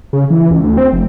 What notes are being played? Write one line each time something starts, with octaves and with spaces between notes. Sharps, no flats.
C#3
E3
C#2
D2
C4
F1